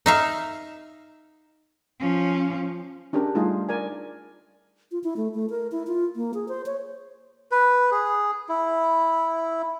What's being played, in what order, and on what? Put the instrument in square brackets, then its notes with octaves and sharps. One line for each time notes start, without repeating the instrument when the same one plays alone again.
[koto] D#4 E5 F5
[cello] F3 C#4
[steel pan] C#4 D4 G4 G#4 A#4
G3 A3 D#4 F4 G#4
A#4 D5 G#5
[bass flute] F4
E4
A3
A3
A#4
E4
F4
A#3
G#4
C5
C#5
[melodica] B4
G#4
E4